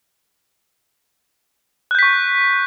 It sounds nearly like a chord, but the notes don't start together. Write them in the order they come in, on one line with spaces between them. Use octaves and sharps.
F#6 G6 B6 C#6